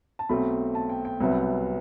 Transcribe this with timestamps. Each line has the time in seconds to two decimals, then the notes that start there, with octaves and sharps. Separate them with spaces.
0.19 A5
0.29 B1 B2 A3 C4 B5
0.75 A5
0.90 G5
1.05 G5
1.20 C2 C3 F#3 B3